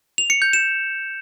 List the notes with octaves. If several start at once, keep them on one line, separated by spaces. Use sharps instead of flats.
F7
C#7
G6
E7